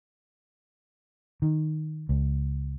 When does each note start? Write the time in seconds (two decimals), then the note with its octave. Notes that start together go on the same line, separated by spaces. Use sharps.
1.42 D#3
2.09 C#2